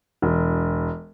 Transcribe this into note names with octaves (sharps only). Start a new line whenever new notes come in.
E1